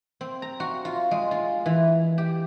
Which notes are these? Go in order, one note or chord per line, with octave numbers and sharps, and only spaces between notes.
C4
A#5
F#4
F4
G#3
F4
E3
G4